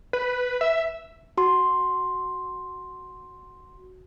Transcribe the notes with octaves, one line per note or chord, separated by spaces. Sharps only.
B4
E5
F#4 C6